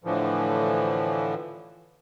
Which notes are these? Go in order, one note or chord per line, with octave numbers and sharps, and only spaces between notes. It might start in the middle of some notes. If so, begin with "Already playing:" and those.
A2 D3 E3 F3